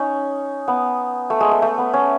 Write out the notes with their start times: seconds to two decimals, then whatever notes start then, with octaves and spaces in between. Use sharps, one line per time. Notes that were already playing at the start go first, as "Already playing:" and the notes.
Already playing: C#4 D#4
0.68 B3
1.30 A3
1.40 G#3
1.51 A3
1.62 A3
1.78 B3
1.93 C#4